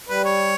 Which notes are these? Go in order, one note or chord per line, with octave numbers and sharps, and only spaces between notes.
G3 B4
C#5